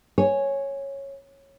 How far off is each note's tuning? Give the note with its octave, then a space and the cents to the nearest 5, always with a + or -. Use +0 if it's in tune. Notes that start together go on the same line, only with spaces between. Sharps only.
C#5 -10 G#5 +0